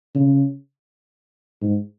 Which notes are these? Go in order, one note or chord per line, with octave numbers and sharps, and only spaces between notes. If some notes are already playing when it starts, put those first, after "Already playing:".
C#3
G#2